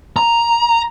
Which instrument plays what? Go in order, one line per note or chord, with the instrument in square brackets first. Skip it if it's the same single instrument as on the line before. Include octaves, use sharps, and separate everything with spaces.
[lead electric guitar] A#5